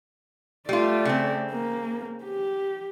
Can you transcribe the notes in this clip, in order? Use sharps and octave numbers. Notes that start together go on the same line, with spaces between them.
G3 A3 F4 D5
C#3 C4
A#3
G4